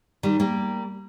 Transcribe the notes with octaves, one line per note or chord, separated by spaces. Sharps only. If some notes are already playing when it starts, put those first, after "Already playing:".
D#3 G3
G3 A#3